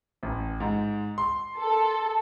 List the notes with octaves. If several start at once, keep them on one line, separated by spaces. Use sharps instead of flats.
A1
G#2
C6
A4